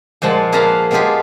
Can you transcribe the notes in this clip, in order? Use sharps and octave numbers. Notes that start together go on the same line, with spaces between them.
A#2 F3 G#3 F#5 A5
A#3 G#4 B4 F5 A5 A#5
G#3 B3 D4 F4 G4 G#4